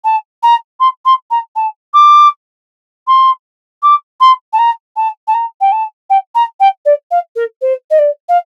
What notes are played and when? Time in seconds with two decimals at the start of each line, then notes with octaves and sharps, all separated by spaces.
0.04 A5
0.42 A#5
0.80 C6
1.05 C6
1.30 A#5
1.55 A5
1.93 D6
3.07 C6
3.82 D6
4.20 C6
4.53 A5
4.58 A#5
4.96 A5
5.27 A5
5.34 A#5
5.61 G5
5.72 A5
6.09 G5
6.35 A#5
6.60 G5
6.85 D5
7.11 F5
7.35 A#4
7.61 C5
7.90 D#5
7.98 D5
8.28 F5